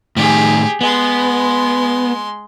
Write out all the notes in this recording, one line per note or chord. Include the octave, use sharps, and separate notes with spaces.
A2 D#3 G4 G#4
G#3 B3 C6